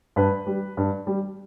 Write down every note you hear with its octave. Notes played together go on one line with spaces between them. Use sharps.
G2 B4
G3
G2
G3